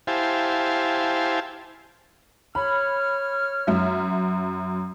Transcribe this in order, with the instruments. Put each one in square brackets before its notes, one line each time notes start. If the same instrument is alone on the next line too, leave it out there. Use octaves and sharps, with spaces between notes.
[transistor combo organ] E4 G4 C5 F5 G#5 A5
[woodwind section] C#5 F6 [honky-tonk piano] B5
[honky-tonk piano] F#2 E5